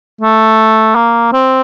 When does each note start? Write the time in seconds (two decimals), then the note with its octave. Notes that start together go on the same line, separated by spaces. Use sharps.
0.21 A3
0.95 A#3
1.33 C4